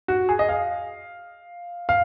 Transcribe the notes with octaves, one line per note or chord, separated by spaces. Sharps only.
F#4
G#4
D#5
F5
F5